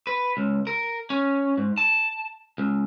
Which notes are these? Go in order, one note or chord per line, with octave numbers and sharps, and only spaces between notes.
B4
C#2
A#4
C#4
G#2
A5
C#2